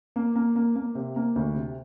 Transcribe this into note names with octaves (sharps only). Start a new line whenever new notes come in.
A#3
A#3
A#3
A#3
C3
A#3
D2
C3